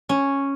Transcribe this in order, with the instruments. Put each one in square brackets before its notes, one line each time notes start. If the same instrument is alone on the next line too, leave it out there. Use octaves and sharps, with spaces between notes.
[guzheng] C#4